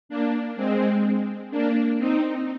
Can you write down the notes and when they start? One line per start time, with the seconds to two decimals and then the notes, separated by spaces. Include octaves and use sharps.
0.09 A#3 D4
0.56 G#3 C4
1.51 A#3 D4
1.99 C4 D#4